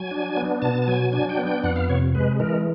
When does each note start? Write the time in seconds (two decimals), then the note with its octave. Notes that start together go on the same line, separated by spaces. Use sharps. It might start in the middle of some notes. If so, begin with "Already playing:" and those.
Already playing: F#3 G#5
0.11 D4
0.37 B3
0.62 B2 A5
0.82 A5
0.88 F#3 G#5
1.12 D4 G#5
1.29 G5
1.38 B3
1.47 G5
1.64 F2 F#5
1.76 F5
1.89 C3 C#5
2.15 G#3 B4
2.40 E3 A#4